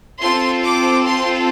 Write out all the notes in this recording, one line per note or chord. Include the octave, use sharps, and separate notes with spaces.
C4 F4 A4 C6
D6
C6